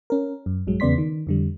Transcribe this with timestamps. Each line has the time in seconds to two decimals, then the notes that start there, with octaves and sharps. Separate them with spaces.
0.10 C#4 A#4
0.46 F#2
0.67 A#1 G2 F#3 G#3
0.80 E2 C#3 B3 D5 C6 B6
0.98 D#3
1.27 F2 D3 G3